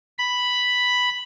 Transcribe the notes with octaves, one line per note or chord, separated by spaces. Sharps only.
B5